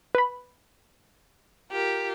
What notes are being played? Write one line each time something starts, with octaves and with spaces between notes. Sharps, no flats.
B4 B5
F4 G4 A#4